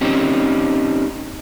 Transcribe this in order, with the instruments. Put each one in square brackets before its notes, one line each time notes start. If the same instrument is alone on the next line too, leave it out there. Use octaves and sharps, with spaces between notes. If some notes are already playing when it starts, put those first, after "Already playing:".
[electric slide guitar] C4 C#4 D#4 G4